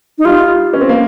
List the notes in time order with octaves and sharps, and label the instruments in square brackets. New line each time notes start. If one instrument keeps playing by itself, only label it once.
[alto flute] D#4
[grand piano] G3 [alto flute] F4
[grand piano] C#4
C4
A#3